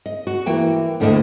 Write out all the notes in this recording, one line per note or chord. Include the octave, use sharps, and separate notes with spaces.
D#5
F#4
E3 A#3 G5
D2 A2 D3 A3 A#3 D#5